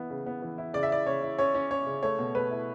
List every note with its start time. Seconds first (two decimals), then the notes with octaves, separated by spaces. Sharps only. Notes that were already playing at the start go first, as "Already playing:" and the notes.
Already playing: E3 B3 E4
0.10 C#3
0.26 B3
0.42 E3
0.58 E4
0.74 C#3 D5
0.83 E5
0.90 E4 D5
1.07 C#3 C#5
1.22 E4
1.38 C#4 C#5
1.54 C#4
1.71 C#4 C#5
1.86 C#3
2.03 A3 C#5
2.19 B2
2.35 A3 B4
2.51 E4